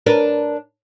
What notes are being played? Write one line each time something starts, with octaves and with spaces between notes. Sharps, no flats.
D4 A#4 B4